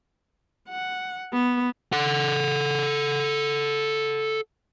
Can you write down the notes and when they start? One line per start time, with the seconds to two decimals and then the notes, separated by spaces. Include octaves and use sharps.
0.69 F#5
1.33 B3
1.92 A4 F#5